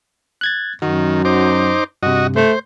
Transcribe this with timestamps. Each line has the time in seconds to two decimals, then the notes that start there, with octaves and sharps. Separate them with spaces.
0.41 F#6 G#6 A6
0.82 F#2 D#3 F#4
1.25 D#4 C5 D6
2.03 G2 C3 F#4 D#5
2.36 A3 C5